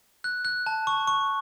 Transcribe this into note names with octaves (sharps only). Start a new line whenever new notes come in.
F#6
F#6
A5
C#6
C#6